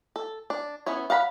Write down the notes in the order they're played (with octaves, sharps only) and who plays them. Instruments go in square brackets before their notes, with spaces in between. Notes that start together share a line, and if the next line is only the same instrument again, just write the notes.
[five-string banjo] A4
D4
B3 C#4 E4 C#5
F5 F#5 A#5 B5